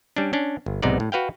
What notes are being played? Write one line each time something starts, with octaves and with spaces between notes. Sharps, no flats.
G3 C#4 D4
C#4 D4
G1
B1 G#2 C3 B3 D#4 D5
A2
F#4 B4 F5 G5